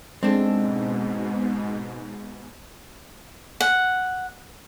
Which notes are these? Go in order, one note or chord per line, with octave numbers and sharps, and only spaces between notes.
G#2 B2 G#3 C4 D4 A4
F#5